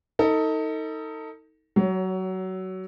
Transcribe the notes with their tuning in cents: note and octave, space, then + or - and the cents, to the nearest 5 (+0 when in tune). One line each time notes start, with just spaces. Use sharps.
D#4 +25 A4 +35
F#3 +20 C#5 +0